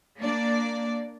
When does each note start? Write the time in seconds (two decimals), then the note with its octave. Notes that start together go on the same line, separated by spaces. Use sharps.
0.20 A#3 D4 D5